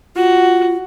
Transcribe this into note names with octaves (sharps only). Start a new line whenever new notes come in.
F4 F#4